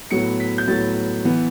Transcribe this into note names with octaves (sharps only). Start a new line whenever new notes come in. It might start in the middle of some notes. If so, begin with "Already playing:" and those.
A2 F#3 B3 C#7
B6
G6
A2 F#3 B3 A6
E3 B3